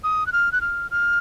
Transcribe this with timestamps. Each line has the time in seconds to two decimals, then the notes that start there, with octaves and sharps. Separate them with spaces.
0.04 D#6
0.27 F#6
0.33 F6
0.52 F#6
0.61 F6
0.91 F6